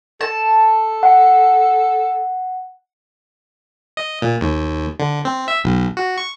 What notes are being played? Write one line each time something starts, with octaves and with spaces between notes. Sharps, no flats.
A4 A5
F#5
D#5
A#2
D#2
D3
C4
E5
B1
F#4
C#6